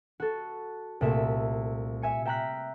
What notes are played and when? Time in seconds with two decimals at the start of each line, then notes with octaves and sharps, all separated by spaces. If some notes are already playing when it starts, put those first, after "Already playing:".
0.20 F#4 A4
1.01 C2 A#2 A3 E5
2.02 E5 G#5 C#7
2.25 E5 G5 A#5 F6 F#6 B6